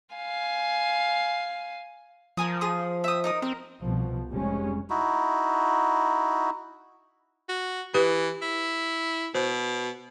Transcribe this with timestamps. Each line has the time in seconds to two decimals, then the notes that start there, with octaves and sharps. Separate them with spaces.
0.15 F5 G#5
2.37 F3 A#4 G#5 D#6
2.61 G#4 D#6
3.04 E5 G5 D#6
3.24 D#4 A#4 D#6
3.42 C4 A#4
3.82 C2 B2 F3
4.32 F1 G3 G#3 C#4
4.90 D#4 E4 F#4
7.49 F#4
7.94 E3 G4 B4
8.42 E4
9.35 B2 C5